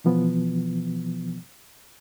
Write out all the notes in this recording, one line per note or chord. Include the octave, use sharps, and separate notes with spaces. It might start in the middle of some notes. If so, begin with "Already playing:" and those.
B2 E3 F3 B3